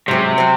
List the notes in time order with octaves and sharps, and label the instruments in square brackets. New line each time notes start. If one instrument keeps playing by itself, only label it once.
[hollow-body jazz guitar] G#2 F#3 C4 [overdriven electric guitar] C3
[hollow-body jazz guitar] F#3 C4